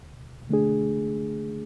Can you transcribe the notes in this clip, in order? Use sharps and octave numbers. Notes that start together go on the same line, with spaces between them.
D2
D3 A3 D4 G#4